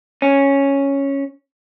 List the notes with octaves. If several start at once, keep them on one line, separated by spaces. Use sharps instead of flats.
C#4